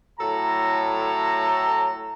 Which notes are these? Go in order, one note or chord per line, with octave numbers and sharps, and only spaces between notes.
A2 F#3 A4 A#5